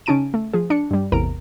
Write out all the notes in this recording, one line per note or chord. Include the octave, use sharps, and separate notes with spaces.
C#3 C#4 D#4 A5 D7 D#7
A3
F3 G#4
D4 C#7
G2 G3
A1 E2 C3 A#4 A#5 D7